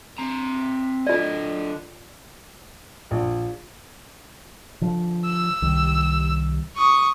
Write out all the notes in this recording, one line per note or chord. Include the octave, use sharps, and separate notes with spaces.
C4 A#5
D3 F4 D5 D#5
A#1
D3 F3
E6
C2 D#3 G3
C#6 D#6